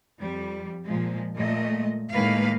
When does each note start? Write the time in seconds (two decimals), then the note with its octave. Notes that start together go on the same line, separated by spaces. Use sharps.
0.20 F2 G3
0.85 A#2 F3 G#3
1.35 A#2 G#3 A3 D#5
2.11 A2 D#3 G#3 A#3 B4 F5